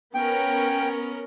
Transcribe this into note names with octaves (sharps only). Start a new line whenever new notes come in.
B3 C#4 A#4 G5